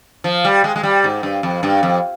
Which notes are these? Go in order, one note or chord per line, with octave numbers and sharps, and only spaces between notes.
F3
G3
G#3
G#3
G3
G#2
G2
F2
G2
F2